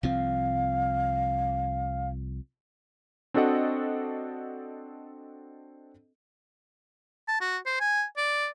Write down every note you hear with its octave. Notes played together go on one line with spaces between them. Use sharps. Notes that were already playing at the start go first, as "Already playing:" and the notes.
C2 F3 C4 F5
C4 D4 F#4 A4 D#5 F#5
A5
F#4
C5
G#5
D5